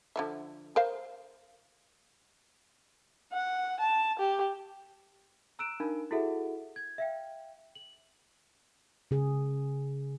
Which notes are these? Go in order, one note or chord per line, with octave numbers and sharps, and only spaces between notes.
D3 F3 E5
A#4 C5 F5
F#5
A5
G4
A#5 E6 F#6 D7 E7
D4 D#4 A#4 F5 B5
E4 F#4 G#4 A4 E5 F#5
G#6
E5 F5 G5
F#7
C#3 G#4